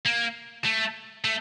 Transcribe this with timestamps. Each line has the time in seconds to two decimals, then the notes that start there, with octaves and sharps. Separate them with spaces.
0.06 A#3
0.65 A3
1.25 A3